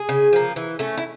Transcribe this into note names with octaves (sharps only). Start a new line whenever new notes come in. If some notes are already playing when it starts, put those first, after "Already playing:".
Already playing: G#4
C#3
F3 A#3
E3
A3 C#4
E4